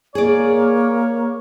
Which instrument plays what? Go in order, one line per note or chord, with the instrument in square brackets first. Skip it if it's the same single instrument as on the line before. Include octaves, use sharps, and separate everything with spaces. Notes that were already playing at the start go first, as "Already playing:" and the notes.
[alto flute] A#3 [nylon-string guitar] G#4 D5 [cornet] C#5